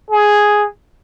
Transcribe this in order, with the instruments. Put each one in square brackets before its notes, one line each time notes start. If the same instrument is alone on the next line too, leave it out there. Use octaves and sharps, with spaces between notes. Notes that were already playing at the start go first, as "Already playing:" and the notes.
[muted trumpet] G#4